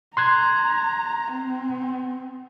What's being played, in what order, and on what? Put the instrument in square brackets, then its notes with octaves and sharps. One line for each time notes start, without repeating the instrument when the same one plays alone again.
[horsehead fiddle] A#5 [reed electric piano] C6 F#6 G#6
[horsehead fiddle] C4